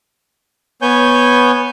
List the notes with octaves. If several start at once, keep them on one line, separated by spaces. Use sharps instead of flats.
B3 C#5 G#5 G6